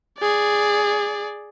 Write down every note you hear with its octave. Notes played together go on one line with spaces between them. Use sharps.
G#4 D5